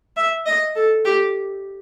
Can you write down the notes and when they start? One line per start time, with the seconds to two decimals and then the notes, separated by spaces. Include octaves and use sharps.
0.17 E5
0.46 D#5
0.75 A4
1.05 G4